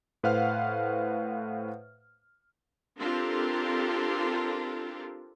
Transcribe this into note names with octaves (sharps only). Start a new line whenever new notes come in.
A2 B4 C5 F5 F#5 F6
C4 D4 F4 G4 A4 A#4